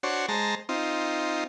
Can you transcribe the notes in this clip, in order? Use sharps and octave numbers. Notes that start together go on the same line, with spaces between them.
D4 F#4 C5 C#5
G#3 C5 A5 A#5
C4 D#4 F4